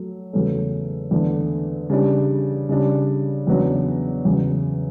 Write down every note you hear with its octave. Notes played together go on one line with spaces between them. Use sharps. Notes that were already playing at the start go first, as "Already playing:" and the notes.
Already playing: F#3 A3
E2 C#3 F#3 A3 C#4
E2 D3 A3 D4
C#3 G3 D4
C#3 G3 D4
E2 C#3 F#3 B3 D4
E2 C#3 F#3